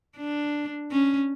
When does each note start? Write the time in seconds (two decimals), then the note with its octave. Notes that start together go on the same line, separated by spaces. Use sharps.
0.17 D4
0.91 C#4